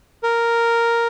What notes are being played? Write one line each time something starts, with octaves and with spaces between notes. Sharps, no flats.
A#4